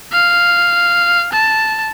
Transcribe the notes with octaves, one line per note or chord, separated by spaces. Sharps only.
F5
A5